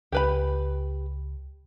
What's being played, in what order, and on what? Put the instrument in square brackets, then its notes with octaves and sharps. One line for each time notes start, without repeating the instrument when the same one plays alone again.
[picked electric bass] C#2 [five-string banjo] G4 B4 B5